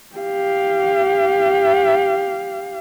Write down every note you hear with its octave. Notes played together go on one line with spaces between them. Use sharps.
G4 F5